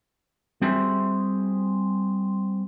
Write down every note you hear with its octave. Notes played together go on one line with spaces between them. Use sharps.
G3 C4 F#4 G#4 C5 E5